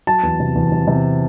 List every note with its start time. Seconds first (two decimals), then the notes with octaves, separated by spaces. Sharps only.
0.07 F#3 A5
0.23 E2
0.40 C3
0.55 E2
0.72 C3
0.88 C3